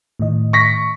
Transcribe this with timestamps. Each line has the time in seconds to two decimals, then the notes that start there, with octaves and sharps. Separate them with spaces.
0.19 A2 D#3 D#5
0.53 C#6 A#6 B6